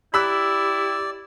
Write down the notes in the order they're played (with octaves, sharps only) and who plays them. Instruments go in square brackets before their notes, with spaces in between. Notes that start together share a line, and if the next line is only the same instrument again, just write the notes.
[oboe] E4 [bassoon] G4 [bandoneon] D5 [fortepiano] B5 E6 F#6